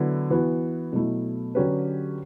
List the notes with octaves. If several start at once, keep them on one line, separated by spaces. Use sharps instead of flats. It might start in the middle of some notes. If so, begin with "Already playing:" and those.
Already playing: D3 F#3 B3 E4
E3 B3 F#4
B2 F#3 A3 E4
D3 F#3 C#4 G4 B4